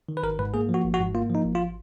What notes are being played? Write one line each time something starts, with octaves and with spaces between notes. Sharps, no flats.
D#3
B4
G#1 A#4
G#2 B4
A#3 G#4
F3
F#4
G#1
F#4
G#2
A#3 F4
F3
D#4
G#1
F4